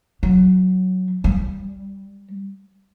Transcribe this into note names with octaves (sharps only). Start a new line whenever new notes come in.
F#3
G3